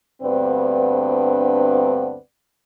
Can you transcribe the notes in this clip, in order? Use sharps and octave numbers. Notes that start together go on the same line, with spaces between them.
D2 G2 B3 C4 B4 D5